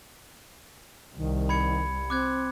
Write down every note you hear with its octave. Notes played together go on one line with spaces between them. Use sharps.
C2 D#3
B5 G#6 C#7
C4 D6 F#6 G#6